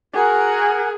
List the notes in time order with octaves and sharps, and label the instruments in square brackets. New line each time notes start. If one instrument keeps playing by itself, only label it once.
[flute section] F#4 A#4 [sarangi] G#4